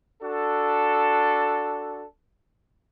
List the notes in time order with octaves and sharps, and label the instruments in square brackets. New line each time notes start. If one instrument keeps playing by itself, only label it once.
[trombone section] D4 F#4 A4